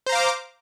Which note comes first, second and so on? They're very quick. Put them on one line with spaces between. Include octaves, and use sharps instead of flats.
C5 A#5 F5 D6